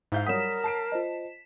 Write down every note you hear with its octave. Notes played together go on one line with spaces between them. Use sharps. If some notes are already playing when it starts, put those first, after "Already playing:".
G#2 E4 E5 F5 G6
F#3 G3 A#4 C#5 F#5 D#6 B6 E7
A5 C7 D7
F4 C5 D#5